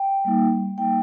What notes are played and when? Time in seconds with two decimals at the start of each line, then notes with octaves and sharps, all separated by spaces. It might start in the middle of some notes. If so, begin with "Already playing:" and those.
Already playing: G5
0.25 G3 A#3 D#4
0.77 G3 A#3 D#4 G5